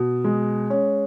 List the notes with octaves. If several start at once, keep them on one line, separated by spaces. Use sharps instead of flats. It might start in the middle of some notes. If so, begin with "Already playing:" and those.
Already playing: B2
G#3
C#4